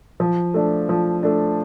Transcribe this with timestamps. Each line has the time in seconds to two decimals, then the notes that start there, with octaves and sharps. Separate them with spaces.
0.20 F3
0.54 A3 D4
0.89 F3
1.23 A3 D4